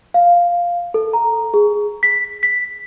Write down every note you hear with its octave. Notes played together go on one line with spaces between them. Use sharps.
F5
A4
A#5
G#4
B6
B6